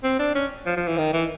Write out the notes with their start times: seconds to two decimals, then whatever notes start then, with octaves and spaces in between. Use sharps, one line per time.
0.04 C4
0.19 D4
0.35 C#4
0.66 F3
0.77 F3
0.87 E3
0.98 D#3
1.13 E3